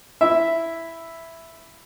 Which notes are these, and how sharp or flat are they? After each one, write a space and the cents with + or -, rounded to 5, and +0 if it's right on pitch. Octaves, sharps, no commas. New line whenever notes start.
E4 +0 E5 +0